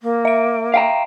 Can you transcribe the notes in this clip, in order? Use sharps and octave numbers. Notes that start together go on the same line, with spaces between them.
A#3
E5 D7
F5 G5 A#5